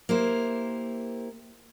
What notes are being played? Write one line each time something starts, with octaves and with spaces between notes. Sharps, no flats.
A#3 E4 G4 C5